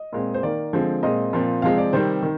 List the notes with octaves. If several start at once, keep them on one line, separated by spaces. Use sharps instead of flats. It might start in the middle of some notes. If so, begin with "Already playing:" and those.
Already playing: D#5
A#2 G#3 C4
C5
D#3 A#3 D5
D3 F3 G#3 C4
A#2 G#3 C4 D#5
A#2 F3 C4
C3 F3 G#3 C4 F5
D5
C3 D#3 G3 C4 C5
D#3